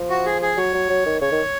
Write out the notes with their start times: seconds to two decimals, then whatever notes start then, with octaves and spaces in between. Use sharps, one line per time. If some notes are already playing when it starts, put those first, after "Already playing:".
Already playing: F3
0.09 F#4
0.26 G#4
0.42 G#4
0.57 F#3 C#5
0.74 F#3
0.89 F#3
1.06 D#3
1.21 C#3 C#5
1.32 D#3